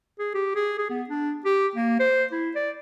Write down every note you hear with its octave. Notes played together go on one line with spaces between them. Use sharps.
G#4
G4
G#4
G#4
B3
D4
G4
A#3
C5
E4
D5